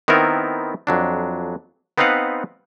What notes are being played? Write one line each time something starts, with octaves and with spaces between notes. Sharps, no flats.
D#3 B3 C4 E4 A#4
F2 F#3 D4
B3 C4 D#4 B4 F5 F#5